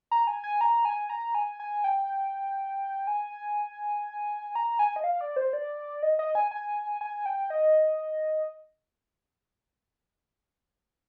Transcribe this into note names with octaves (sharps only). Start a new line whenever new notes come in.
A#5
G#5
G#5
A#5
G#5
A#5
G#5
G#5
G5
G#5
A#5
G#5
D#5
F5
D5
C5
D5
D#5
D#5
G#5
G#5
G#5
G5
D#5